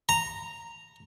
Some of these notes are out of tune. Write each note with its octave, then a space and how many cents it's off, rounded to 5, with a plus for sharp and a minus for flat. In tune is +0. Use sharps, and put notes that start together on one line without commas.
A#5 -10